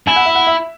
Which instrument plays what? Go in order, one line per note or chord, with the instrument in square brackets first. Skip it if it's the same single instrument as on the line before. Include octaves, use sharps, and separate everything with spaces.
[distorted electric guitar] E4 [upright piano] G#5
[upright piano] F#5
E5
F#5
E5